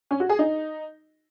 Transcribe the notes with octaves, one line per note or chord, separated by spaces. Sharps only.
C#4
F#4
G#4
D#4